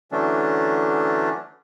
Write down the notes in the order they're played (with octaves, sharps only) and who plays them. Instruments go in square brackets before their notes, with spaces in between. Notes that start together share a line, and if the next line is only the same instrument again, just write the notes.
[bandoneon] D3 E3 F#3 A3 C#4 D4